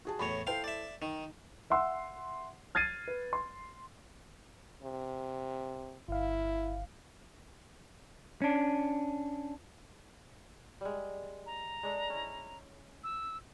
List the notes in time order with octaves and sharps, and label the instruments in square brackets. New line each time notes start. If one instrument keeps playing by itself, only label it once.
[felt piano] F#4 G#4 A5
[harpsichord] E2 A2 C#5 [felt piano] B5 C#6
[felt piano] E4 A4 C5 [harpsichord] F5 G5 C6
[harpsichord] D5 E5
[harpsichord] D#3 [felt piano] D#4
[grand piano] E5 F#5 C6 E6
F6 G#6 A6 C7 D#7
B4
C6
[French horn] C3
[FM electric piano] G1 F5 [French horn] E4
[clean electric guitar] C#4 D4
[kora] G3 G#3
[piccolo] A#5
[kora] G#3 D4 A4
C#4 E4
[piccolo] E6